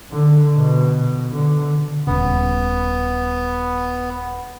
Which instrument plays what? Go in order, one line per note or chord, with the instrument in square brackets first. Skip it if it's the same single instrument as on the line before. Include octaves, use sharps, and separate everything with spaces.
[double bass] D3
B2
D3
[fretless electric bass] D#1 G#1 C#3 [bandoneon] B3